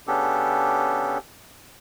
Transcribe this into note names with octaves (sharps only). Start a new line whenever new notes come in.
C#3 B3 C#4 D4 G4 A4